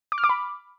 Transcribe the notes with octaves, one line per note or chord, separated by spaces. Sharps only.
D6
F6
D6
B5